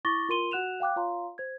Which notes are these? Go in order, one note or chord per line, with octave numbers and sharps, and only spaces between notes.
E4 C#6 D6 A6 A#6 G7
F4 A#4 C6 D#7 G7
F#4 F#5 F#6 E7 F7
F5 G5 D6 F#6
F4 C#5 F5 A#5 C6
C5 G#6